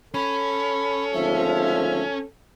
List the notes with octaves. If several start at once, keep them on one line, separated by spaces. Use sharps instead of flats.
C#4 A4 B5
G#1 D2 F3 E5